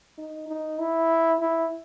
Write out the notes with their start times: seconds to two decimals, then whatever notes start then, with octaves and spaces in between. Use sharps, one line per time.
0.18 D#4
0.49 D#4
0.79 E4
1.40 E4